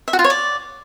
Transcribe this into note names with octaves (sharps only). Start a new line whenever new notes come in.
E5
F#4
F4
C#5
D5